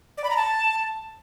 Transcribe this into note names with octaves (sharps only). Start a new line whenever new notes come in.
D5
B5
A#5
A5